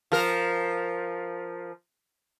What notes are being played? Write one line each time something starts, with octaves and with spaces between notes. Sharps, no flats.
F3 A#4